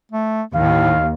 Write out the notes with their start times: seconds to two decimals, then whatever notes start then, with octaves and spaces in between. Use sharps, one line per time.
0.12 A3
0.55 D#2 A2 F5